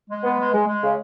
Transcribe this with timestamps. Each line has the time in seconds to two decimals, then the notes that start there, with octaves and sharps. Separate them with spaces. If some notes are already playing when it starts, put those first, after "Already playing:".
0.09 G#3
0.24 B3
0.38 G#3
0.53 G#3
0.68 G#3
0.82 C#3